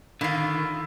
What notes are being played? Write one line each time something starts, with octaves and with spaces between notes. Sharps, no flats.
D3 D#3 E4 F4